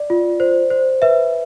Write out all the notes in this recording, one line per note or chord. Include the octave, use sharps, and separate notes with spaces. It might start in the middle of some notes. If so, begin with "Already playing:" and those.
Already playing: D5
F4
C5
C5
B4 E5